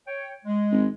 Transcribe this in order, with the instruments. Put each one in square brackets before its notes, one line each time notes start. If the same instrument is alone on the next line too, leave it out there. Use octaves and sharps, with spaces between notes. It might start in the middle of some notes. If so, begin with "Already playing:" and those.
[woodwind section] C#5 G5
G#3
[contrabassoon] G#1